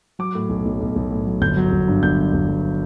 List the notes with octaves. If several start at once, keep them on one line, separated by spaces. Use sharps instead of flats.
F#3 D6
A2
B1
B1
B1
B1
A2
F#3
G1 G6
F#3
G1
G2
G1 G6
F#3
G1
F#3